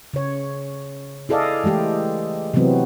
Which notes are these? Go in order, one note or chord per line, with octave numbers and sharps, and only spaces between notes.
C#3 C#5
E4 G#4 A4 D5 D#5 F5
E3 G#3 A3 G4
C3 E3 F#3 B3 C4